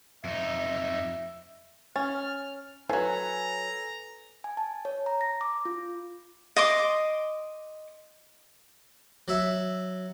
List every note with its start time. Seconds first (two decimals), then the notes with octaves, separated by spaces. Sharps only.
0.25 F2 D#4 E5
1.96 C#4 F6 A6
2.89 F3 F#3 A4 B4 G#5 A#5
4.44 G#5
4.57 A5
4.85 C#5
5.06 A#5
5.21 A#6
5.41 D6
5.65 F4
6.56 D#5 C6 D6
9.28 F#3 E5